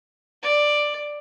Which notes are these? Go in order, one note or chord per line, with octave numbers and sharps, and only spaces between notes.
D5